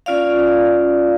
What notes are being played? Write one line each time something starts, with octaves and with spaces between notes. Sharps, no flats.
C#4 F4 D5 F5